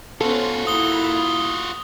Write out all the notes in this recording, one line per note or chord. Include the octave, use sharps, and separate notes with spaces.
B3 C#4 F4 F#4 A4 C5
A#3 E4 D#6 G7